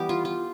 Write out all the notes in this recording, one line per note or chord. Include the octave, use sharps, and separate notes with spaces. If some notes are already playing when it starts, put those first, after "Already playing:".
Already playing: E3 G3 B3 G4
F4
F4